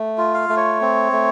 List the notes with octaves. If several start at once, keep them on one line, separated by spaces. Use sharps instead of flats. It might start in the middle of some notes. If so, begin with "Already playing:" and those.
Already playing: A3
F4
F5
A3
C#5
C4
A3